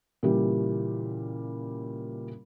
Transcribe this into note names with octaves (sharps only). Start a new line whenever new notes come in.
A#2 C#3 E3 G3 G4